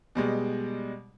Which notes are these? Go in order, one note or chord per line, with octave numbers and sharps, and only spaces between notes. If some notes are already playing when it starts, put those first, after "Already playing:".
B2 G3 G#3